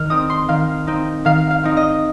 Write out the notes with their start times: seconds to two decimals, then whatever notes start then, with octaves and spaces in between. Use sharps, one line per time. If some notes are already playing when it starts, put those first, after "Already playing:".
Already playing: D#3 F6
0.10 C4 D#4 D#6
0.30 C6
0.49 D#3 F5
0.87 C4 D#4
1.25 D#3 F5
1.50 F5
1.64 C4 D#4
1.77 D#5